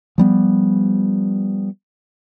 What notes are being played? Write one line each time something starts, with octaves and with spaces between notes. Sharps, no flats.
F3 G3 B3